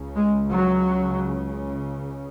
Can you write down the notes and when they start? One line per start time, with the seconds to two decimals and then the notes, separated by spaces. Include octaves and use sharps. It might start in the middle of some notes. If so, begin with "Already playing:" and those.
Already playing: C#2 C#3
0.16 G#3
0.53 F#3